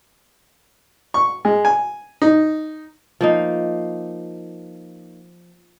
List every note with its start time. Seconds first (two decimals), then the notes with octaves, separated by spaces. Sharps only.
1.14 C#6
1.45 G#3
1.65 G#5
2.22 D#4
3.21 F3 A#3 D#4